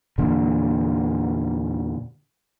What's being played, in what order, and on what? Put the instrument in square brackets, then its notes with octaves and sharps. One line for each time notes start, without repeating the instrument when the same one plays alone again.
[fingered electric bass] E2 A#2 D3